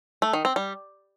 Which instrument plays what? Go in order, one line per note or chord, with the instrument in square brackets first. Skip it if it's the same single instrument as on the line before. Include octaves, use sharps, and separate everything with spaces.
[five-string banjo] A3
D#3
C4
G3